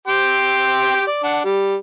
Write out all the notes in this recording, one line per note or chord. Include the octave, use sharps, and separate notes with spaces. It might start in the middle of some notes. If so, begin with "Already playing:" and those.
G4 G5 C6
D5
D4 F#5
G3